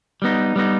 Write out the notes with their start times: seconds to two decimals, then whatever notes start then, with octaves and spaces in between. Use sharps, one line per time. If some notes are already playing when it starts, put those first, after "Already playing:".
0.22 G3 B3 D#4
0.56 G3 B3 D#4